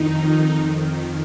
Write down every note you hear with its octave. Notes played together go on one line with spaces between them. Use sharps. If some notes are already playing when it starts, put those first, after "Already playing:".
Already playing: F2 D#3 D#4